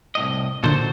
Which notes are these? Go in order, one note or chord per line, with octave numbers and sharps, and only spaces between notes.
C2 A2 D#5
A#2 D3 F#3 A4 C5